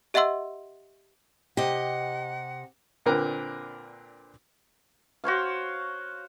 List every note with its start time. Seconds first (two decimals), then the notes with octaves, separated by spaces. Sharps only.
0.14 G4 D#5 E5 F#5 C6 E6
1.57 C3 G4 D#5 F#5
3.06 A#2 D3 C4 A#4 B4
5.24 F#4 C5 C#5 F5